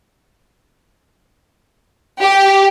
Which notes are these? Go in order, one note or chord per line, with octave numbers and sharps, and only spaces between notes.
G4